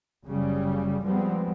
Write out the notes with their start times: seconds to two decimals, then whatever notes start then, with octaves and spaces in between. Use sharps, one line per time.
0.25 F#1 C#3 G3
1.04 F3 G3 G#3 B3 C4